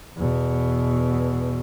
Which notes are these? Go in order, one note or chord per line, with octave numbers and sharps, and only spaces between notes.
E2 B2